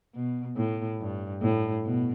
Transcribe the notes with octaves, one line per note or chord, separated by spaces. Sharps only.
B2
A2
G2
A2
B2